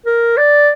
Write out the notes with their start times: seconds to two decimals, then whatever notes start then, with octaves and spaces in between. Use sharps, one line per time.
0.06 A#4
0.37 D5